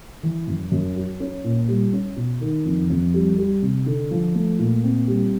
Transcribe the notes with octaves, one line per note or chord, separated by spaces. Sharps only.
E3
F#2
F#2
F#3
C#4
A#2
G3
C#4
B2
D#3
F2
F2
G3
G3
C3
D3
F3
A3
A#2
C4
G3